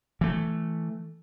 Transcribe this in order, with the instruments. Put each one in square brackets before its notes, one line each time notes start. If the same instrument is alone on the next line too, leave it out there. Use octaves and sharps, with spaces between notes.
[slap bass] E3 A3